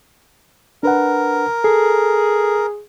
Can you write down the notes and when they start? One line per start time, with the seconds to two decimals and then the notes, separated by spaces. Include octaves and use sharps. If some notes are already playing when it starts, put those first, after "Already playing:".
0.83 D4 A#4 B4 F#5
1.64 G#4 A4